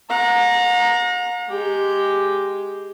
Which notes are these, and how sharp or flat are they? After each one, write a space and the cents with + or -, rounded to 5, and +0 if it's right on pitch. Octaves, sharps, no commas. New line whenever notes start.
F#5 -45 A#5 +0
G#3 +0 G4 +0